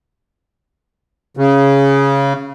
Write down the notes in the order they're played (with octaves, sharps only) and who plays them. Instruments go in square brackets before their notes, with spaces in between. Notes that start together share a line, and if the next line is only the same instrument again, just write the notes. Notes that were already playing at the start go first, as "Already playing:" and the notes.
[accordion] C#3